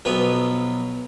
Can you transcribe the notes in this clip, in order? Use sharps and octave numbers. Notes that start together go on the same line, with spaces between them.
B1 F3 F#3 B3 B4